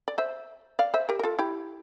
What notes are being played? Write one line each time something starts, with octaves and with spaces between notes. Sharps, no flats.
D5
C5 E5
D5 F5
C5 E5
G4 A#4
A#4
F4 A4
E4 G4